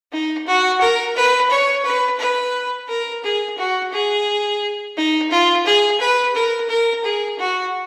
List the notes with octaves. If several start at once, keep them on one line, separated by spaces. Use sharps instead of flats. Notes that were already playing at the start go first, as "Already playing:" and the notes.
D#4
F#4
A#4
B4
C#5
B4
B4
A#4
G#4
F#4
G#4
D#4
F4
G#4
B4
A#4
A#4
G#4
F#4